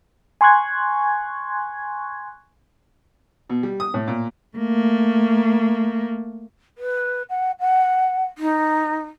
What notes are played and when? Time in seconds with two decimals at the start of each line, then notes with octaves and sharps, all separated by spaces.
0.41 G#5 C6 C#6 F#6 G#6
3.49 B2
3.63 G3
3.80 D#6
3.94 A2
4.08 A#2
4.57 A3 A#3
6.78 B4
7.29 F#5
7.60 F#5
8.38 D#4